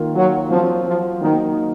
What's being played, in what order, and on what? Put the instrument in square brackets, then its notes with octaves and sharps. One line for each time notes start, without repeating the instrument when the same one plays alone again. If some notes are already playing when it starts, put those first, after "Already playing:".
Already playing: [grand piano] D#3 A#3 F4
[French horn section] F#3
[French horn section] F3 [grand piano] F#3 C4 F4
[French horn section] F3
[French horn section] D#3 [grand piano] F#3 A#3 D#4